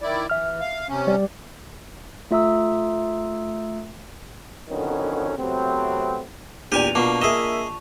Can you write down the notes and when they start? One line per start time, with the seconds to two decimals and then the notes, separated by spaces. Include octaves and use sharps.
0.01 D#3 E4 D5
0.30 E3 E5 F6
0.61 F5
0.89 C3 C#4
1.07 G3 G4 D5
2.31 A3 F4 E5 A#5 D#6 E6
4.69 F2 D3 D#3 F#3 B3 C#4
5.37 C3 F#3 A3 B3 C4
6.72 E2 A#2 D4 G4 D5 G#5 D#7 F7
6.95 B2 A#3 F4 F#5 A5 C#6 D6
7.22 A#3 G#4 D#5 E5 E7